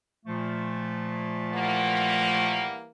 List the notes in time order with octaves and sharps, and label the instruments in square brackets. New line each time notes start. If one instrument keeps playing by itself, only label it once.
[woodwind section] A#2 F3 A3
[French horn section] E3 G3 A#3 [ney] F#5